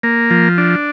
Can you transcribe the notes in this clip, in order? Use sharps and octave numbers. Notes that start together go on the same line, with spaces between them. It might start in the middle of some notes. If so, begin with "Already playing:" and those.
A#3
F3
D4